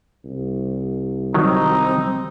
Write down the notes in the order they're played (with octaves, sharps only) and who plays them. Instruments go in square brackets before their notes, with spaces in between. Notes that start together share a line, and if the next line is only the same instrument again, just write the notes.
[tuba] C2
[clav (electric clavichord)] D#3 F#3 [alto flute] C4 [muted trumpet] D#4